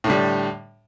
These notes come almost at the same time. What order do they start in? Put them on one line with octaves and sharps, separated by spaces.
A2 D3 G3